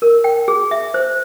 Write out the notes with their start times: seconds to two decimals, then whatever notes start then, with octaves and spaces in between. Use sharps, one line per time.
0.02 A#4
0.24 G5
0.48 G#4
0.71 E5
0.94 C5